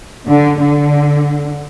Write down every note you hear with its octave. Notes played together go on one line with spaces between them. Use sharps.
D3
D3